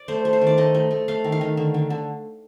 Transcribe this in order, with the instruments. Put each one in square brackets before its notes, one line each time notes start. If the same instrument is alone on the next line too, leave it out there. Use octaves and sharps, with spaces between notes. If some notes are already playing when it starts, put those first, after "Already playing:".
Already playing: [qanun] D5
A3 C5
A3
C5
D#3
D5
A3 D#5
A3
A3
A3 F5
D#3
F5
D#3
D3
D3
D3